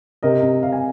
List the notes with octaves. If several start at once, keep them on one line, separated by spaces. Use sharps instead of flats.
C3 A#4 D#5
C3
C3 F5
G#5